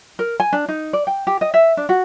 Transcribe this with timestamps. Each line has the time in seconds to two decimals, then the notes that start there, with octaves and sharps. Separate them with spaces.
0.19 A#4
0.40 G#5
0.53 D4
0.69 D#4
0.93 D5
1.07 G5
1.27 G4
1.41 D#5
1.54 E5
1.77 D4
1.89 F#4